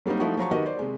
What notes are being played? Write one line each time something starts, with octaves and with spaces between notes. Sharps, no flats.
F#3 G3 A#3 C4 D#4
F3 A3 D#4 E4 F#4
F3 F#3 A#5 C#6
D#3 F#4 G4 A#4 B4 D#5
C5 D5
C3 G#3